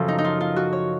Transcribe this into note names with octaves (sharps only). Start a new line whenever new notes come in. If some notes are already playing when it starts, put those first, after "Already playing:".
Already playing: F#2 C#3 F3 A4
D#4
D#4
F4
F4
F#4
C#5